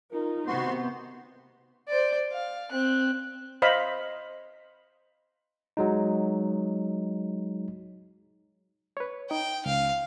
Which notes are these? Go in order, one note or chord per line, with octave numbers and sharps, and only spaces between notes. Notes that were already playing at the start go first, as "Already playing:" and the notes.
D#4 F4 A#4
C3 D#3 B3 F#4 C5 C6
C5 D5
F5
C4 F#6
C5 D#5 F5 B5
F#3 G#3 D#4
B4 C#5
D#4 G5
C#2 F5